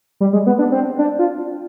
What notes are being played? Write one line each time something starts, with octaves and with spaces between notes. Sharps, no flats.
G3
G#3
B3
D4
C4
D4
F4